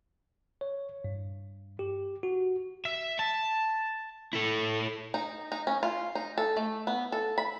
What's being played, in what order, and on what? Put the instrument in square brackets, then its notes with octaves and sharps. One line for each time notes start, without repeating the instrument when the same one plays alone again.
[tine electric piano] C#5
G2
G4
F#4
[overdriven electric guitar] E5
A5
E4 A4
[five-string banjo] D#4
D#4
C#4
F4
D#4
A4
A3
B3
A4
B5